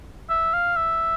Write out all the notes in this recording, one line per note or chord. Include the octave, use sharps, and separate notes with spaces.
E5
F5
E5